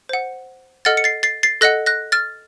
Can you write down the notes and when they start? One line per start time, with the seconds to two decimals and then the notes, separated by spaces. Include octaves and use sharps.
0.09 C5 F#5
0.85 A4 D#5 F#5 F6 A6
0.97 C#7
1.04 A6 C7
1.23 A6 C7
1.43 A6 C7
1.61 A4 D#5 F#5 F#6 A#6
1.86 F#6 A#6
2.12 F6 A6